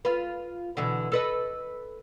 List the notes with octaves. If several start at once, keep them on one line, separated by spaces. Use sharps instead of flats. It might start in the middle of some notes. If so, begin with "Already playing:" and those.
F4 B4
B2 D3 E3
A4 B4 D#5